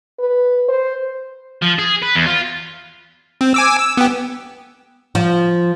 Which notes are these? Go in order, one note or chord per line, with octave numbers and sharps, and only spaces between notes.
B4
C5
F3
G#4
B4
E2
F4
C4
G#5 D6 E6
E6
B3 G4
F3